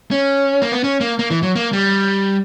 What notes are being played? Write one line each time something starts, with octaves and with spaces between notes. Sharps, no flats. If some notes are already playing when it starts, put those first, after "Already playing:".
C#4
A#3
B3
C#4
A#3
A#3
E3
F#3
A#3
G3